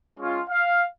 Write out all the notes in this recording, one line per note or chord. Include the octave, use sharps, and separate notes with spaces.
G#3 C#4 F4
F5